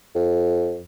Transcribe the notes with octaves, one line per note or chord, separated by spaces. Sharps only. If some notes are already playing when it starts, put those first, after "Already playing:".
F2